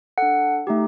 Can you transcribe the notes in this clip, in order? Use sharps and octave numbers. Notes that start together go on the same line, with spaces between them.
D4 A4 F#5
A3 D#4 G4